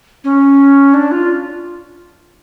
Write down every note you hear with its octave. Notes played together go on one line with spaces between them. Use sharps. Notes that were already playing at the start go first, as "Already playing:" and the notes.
C#4
D4
F4